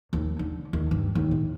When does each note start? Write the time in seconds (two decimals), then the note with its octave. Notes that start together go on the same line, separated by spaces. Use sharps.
0.13 D#2
0.39 D3
0.73 D#2
0.91 G2
1.15 D#2
1.31 A2